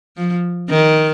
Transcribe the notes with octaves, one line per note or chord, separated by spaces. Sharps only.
F3
D#3